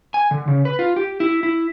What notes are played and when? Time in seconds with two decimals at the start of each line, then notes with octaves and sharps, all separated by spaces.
0.14 G#5
0.31 D3
0.48 C#3
0.65 B4
0.79 F4
0.96 G4
1.20 E4
1.43 E4